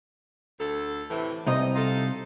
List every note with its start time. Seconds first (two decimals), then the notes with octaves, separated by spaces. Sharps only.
0.59 D2 A4
1.10 A2 C3 E3
1.47 C2 C3 D#4 D#5
1.76 D#4 F4 A4